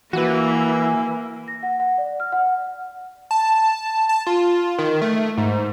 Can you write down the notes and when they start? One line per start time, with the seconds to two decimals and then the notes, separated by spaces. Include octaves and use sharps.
0.13 E3 A#3 E4 F#4 B4
1.48 A#6
1.63 F#5
1.80 F#5
1.98 D5
2.20 F6
2.32 F#5
3.31 A5
4.09 A5
4.27 F4
4.78 D#3
5.02 A3
5.37 G#2